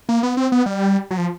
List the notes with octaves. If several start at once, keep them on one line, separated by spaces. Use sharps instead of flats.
A#3
B3
C4
B3
G3
F#3
F3